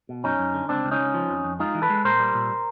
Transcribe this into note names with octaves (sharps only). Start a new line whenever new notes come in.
B2
F#2 C#4 D#4
F#2
D3
C#2 C4 D4
C#2
C#4 D#4
C#2
F3
F2
F2
G#3 D#4 F4
E3
A4 B4
G#3
A#2 A#4 C5
G3
A#2